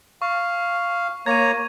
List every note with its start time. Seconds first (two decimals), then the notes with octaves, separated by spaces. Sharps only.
0.22 F5 C#6
1.26 A#3 C#5 A#5 G#6 D#7